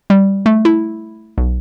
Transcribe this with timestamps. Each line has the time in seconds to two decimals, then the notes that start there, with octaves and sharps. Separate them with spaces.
0.10 G3
0.46 A3
0.65 E4
1.38 B1